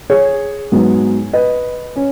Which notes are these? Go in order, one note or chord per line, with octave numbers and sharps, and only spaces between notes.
G#4 C#5
G#2 F#3 B3
B4 D#5
C#4